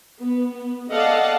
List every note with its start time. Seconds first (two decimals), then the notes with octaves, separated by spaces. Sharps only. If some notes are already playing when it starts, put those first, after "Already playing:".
0.19 B3
0.52 B3
0.90 A4 D5 D#5 F5 F#5 A5